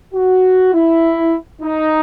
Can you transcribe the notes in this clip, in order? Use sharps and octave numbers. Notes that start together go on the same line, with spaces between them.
F#4
E4
D#4